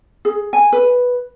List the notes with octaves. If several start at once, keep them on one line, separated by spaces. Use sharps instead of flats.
G#4
G#5
B4